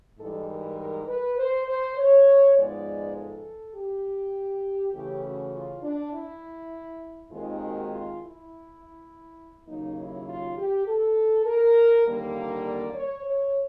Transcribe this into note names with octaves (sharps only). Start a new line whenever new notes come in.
G#2 E3 G3 A4
A#4
A#4
B4
C5
C5
C#5
G#2 F3 G#3 B3 D5
A4
G4
C#3 E3 A3 C#4 G4
F#4
F4
D4
E4
D#2 D#3 G#3 C4 F4
F#4
F4
E4
D#2 C#3 F#3 A#3 D#4
E4
F4
G4
A4
A#4
D#2 D3 G3 A#3
D5
C#5
C#5